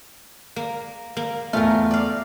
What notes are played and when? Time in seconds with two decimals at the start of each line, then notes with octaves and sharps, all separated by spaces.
0.56 A#3
1.17 A#3
1.53 E2 A3 F4 A#4
1.91 D5 F5